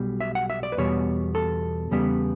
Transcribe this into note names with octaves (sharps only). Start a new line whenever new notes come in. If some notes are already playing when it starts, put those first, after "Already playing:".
Already playing: B1 B2 G3
E5
F#5
E5
D5
B4
E2 B2 G3 B3 C#5
A4
E2 C#3 G3 B3